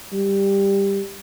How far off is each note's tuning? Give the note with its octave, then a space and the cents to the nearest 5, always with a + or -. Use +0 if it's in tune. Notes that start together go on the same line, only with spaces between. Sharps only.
G3 +10